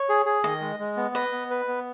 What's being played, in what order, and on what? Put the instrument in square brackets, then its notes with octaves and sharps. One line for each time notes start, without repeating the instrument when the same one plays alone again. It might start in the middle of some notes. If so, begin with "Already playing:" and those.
Already playing: [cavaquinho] C#5
[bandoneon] G#4
G#4
[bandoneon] D#3 [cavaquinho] D#5
[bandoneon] G#3
G#3
B3
[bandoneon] B4 [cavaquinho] D#5
[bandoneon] B3
B4
B3